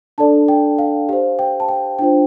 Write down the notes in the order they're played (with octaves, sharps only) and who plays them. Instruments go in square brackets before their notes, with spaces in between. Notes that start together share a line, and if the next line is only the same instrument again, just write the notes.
[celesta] D4 A4 D5 A5
G5
F5
G4 C5 F5
G5
A5
G5
D4 F4 C5 G5